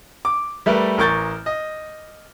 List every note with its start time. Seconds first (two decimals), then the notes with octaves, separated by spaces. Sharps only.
0.25 D6
0.66 G3 A3 A#4 B4
0.98 A1 A#4 C#6 G6 A6
1.46 D#5